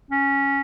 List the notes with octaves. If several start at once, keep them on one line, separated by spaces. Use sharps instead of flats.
C#4